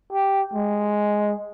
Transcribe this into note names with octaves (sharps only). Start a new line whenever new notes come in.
G4
G#3